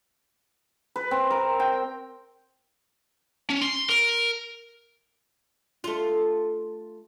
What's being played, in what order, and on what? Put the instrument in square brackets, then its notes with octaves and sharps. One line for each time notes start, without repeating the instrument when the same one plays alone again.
[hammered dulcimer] B4
C4
A#4
G5
[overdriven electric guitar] C#4
C6
A#4
[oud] A3 F4